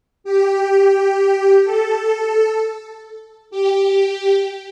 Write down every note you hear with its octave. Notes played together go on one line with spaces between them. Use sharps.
G4
A4
G4